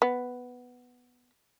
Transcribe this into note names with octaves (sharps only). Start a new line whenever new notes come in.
B3